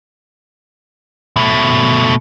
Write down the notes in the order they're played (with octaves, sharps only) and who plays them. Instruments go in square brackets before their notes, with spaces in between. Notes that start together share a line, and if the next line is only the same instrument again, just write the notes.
[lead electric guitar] B2 A3